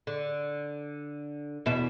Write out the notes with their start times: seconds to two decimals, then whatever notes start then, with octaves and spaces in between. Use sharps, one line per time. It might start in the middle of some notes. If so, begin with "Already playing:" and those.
0.07 D3
1.66 E2 B2 E5